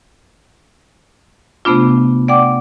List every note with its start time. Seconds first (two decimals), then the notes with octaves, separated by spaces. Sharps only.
1.65 C3 A3 B3 D4 F4
2.28 D5 F#5 G5 D6